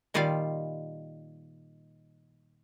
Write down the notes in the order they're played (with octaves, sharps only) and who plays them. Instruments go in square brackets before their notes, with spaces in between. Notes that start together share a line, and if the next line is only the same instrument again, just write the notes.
[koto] A#2 D#3 G3 F4 D5 F5